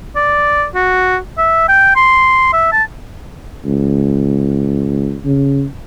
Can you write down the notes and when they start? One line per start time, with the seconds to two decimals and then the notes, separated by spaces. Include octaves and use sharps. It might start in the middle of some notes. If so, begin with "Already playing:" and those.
0.16 D5
0.75 F#4
1.38 E5
1.69 G5
1.96 C6
2.53 E5
2.72 A5
3.65 C#2
5.25 C#3